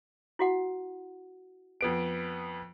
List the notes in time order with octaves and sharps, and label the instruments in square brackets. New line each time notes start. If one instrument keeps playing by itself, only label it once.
[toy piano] E4 F#4 F#5
[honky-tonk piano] F2 B3 D7